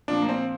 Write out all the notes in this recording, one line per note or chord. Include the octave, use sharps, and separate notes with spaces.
A#2 F3 D4
A#3
C4